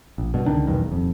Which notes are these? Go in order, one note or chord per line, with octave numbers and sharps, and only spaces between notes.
A#1
G2 B2
C#2 D3 D#3 D4
B1 E2 G2 D#3
D#1 F2